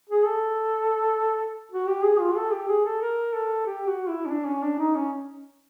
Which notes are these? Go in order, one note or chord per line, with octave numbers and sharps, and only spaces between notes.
G#4
A4
F#4
G4
G#4
F4
A4
G4
G#4
A4
A#4
A4
G4
F#4
E4
C#4
D4
C#4
D4
D#4
C#4